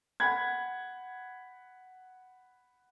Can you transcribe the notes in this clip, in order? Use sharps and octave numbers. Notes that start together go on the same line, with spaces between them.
F#5 B5 G#6